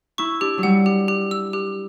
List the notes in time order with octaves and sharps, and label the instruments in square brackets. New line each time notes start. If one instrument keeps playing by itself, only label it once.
[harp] E4 [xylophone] C#6
[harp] D4 [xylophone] G4
[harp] F#3
[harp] G3 [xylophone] F#5
[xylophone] G4
G4
E6
G4